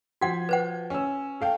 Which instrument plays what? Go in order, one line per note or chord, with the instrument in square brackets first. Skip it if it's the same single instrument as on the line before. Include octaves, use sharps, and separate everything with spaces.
[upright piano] F3 G#6 [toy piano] F#4 F#5
[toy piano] B4 C5 F#5
[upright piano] C#4 E6
A4 F5 G5